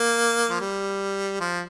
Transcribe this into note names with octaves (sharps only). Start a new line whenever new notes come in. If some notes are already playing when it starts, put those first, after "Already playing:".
Already playing: A#3
F3
G3
F3